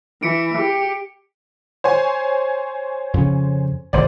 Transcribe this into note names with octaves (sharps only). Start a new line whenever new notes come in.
E3 B6 C#7 D7
G4
C5 C#5 G#5
F2 C#3 C#4
G#1 D2 C3 C5 D5